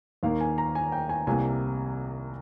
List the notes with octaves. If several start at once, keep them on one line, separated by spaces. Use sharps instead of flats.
D#2 D#3 A#3 F5
G#5
A#5
G#5
G5
G#5
C2 C3 G3 A#3 G#5